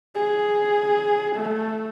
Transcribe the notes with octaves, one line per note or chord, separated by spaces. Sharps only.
G#4
A3